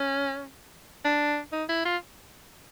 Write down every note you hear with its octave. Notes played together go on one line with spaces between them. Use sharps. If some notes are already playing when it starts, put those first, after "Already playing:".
Already playing: C#4
D4
D#4
E4
F4